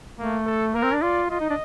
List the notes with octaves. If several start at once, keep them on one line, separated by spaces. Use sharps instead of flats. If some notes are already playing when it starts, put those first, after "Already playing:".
A3 A#3
A4
A#3 A#4
C4
D4
F4 D5
F4 D#5
D#4
D4